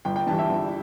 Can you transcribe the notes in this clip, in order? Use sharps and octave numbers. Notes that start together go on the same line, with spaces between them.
G1 G5
G5
G2 E3 G3 A5
E5
G1